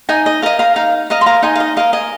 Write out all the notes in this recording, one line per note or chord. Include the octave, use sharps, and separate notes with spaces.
D#4 D#5 G#5
D#5
A#4 D#5 F5
F5 A#5
D#4 F5
A#4 D#5 F5
C6
F5 A#5
D#4 D#5 G#5
F5
D#5
A#4 D#5 F5
D#5 G#5